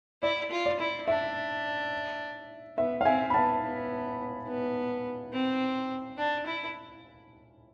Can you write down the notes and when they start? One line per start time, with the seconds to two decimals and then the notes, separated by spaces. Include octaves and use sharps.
0.22 E4 D5
0.51 F4
0.66 D5
0.79 E4
1.08 D4 E5
2.77 B3 E5
3.01 F5
3.05 C4 E5 G#5
3.30 B5
3.34 B3 F5 A5
3.63 B3
4.47 B3
5.33 C4
6.18 D4
6.46 E4